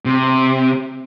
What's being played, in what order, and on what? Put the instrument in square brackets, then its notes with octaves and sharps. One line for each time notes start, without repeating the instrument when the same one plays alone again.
[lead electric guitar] C3